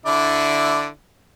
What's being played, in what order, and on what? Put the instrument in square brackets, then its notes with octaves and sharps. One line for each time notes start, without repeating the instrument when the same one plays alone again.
[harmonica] D3 E4 D5